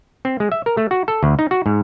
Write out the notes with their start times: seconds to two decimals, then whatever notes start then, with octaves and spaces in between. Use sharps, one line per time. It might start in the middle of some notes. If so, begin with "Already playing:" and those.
0.25 C4
0.40 G#3
0.52 E5
0.66 A#4
0.77 A3
0.91 F#4
1.08 A4
1.23 D2
1.39 D#4
1.51 F#4
1.66 G#2